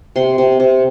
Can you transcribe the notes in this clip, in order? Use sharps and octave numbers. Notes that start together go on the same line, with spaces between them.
C3 C6
C3
C3